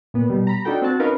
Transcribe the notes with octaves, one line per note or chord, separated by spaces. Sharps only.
A#2 B3
B2 G3
A#5 B5
D4 D#4 F#4 A4 G5
C4 F#4 A5
C#4 D#4 A#4 B4 F5